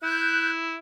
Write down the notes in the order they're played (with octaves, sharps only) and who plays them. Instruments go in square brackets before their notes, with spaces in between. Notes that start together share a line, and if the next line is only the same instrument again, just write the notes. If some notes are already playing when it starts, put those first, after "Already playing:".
[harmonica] E4 [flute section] F#6 G6